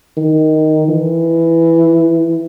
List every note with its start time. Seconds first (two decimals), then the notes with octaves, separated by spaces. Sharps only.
0.17 D#3
0.89 E3